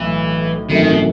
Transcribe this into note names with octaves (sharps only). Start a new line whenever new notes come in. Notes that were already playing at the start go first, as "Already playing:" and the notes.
Already playing: B1 A2 E3
G#1 F#2 D#3 E3 A3 D#4
B2